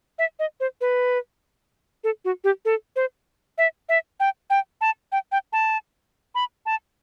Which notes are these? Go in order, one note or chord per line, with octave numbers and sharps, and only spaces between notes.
E5
D#5
C5
B4
A4
F#4
G4
A4
C5
E5
E5
G5
G5
A5
G5
G5
A5
B5
A5